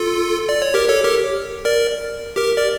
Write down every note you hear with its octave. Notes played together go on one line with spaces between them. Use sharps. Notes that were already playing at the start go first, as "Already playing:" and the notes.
Already playing: F4 A4
D5
C#5
G4 A#4
A4 C#5
G4 A#4
A#4 D5
G4 A#4
A#4 D5